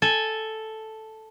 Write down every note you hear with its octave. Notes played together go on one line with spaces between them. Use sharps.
A4 G#5